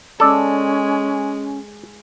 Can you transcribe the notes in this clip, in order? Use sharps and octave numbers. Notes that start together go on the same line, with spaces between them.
G#3 C#4 A4 D5